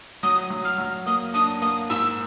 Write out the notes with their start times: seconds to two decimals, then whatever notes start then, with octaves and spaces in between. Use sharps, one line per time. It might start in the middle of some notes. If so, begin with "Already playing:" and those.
0.23 F#3 D#6
0.50 F#3
0.65 F6
0.78 F#3
1.06 A#3 D#6
1.34 D4 D#6
1.62 A#3 D#6
1.90 G#2 E6